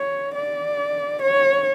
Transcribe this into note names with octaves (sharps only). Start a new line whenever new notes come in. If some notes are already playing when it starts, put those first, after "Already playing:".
Already playing: C#5
D5
C#5